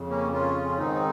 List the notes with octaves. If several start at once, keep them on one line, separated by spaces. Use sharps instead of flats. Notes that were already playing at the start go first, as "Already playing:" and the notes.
Already playing: F2 C#3
A#3 C#4
C#4 F4
C#4
G#2 D#3 C4 D#4